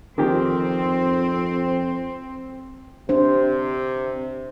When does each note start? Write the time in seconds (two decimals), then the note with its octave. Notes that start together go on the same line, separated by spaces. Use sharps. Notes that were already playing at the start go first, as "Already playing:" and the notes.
0.18 F2 D#3 C4 G4
3.09 C3 D4 C5